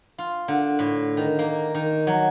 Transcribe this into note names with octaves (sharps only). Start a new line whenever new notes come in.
F4
D3
A2
D#3
A#3
D#3
F#3